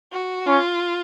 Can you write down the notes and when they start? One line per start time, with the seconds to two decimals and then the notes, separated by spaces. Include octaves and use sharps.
0.12 F#4
0.46 C#4 F4